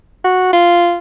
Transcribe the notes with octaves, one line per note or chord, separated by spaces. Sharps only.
F#4
F4